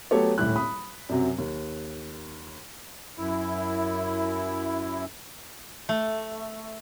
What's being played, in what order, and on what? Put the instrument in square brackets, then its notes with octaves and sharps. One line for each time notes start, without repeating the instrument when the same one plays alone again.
[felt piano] F#3 A3 B3 G4 A4 C#5
D#1 A2 G3 E4 F#6
B5 D#6
F#2 C3 F#3
D#2
[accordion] F#2 E4
[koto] A3